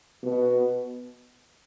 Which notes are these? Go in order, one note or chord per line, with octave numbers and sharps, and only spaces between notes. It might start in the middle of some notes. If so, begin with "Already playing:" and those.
B2